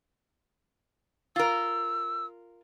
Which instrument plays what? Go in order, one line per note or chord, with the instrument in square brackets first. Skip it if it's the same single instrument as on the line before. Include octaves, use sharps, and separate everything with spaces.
[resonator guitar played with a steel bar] F4 A#4 [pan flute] E6